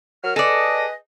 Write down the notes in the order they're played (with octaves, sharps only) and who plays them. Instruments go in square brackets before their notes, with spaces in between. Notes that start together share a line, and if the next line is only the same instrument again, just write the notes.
[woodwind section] F#3 A#4 F6
[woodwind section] G#4 B4 D#5 [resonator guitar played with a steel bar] A4 D5